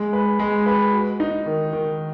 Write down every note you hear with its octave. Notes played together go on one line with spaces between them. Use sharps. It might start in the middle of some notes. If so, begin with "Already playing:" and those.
Already playing: G#3
B4
G#3
B4
F#4
D#4
D#3
D#3